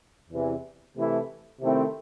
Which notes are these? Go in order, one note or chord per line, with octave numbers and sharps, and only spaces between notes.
E2 C3 E3
C3 E3 A3 E4
C3 D#3 A3 C4 E4